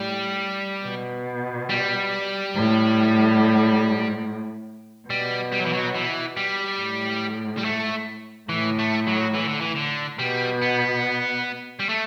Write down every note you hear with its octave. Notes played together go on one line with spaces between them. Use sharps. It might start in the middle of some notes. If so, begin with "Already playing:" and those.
Already playing: A2 G3
B2
G3
A2
B2 G3
G3
F#3
E3
F#3
E3
G3
A2
G3
A3
A2 E3
A3
F#3
E3
D3
E3
D3
B2 G3
B3
G3
A3